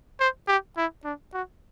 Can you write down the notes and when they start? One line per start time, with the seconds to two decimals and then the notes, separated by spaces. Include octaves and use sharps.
0.20 C5
0.48 G4
0.77 E4
1.04 D4
1.33 F#4